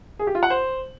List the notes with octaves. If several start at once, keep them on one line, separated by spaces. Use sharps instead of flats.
G#4
G4
F4
F#5
C5